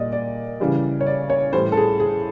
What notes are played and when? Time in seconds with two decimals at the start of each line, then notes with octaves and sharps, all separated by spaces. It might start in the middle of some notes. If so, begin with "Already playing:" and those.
Already playing: A#2 G3 D5 D#5
0.12 D5
0.60 C#3 E3 G3
1.01 C#5
1.06 D5
1.30 C#5
1.53 A2 E3 G3 C5
1.72 A4
1.77 G#4
2.00 G#4